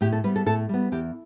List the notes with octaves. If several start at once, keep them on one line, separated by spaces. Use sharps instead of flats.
A2 G4
A4
G3 B3 B4
A4
A2 A4
G3 B3
E2 G4